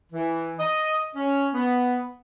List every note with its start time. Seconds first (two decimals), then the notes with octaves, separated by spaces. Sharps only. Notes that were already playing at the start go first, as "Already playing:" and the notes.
0.12 E3
0.59 D#5
1.16 C#4
1.53 B3